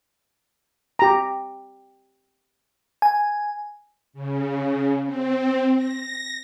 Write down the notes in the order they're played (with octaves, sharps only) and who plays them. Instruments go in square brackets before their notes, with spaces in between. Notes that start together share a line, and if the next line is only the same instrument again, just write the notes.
[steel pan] G4 A#5
[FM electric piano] G#5
[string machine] C#3
C4
A#6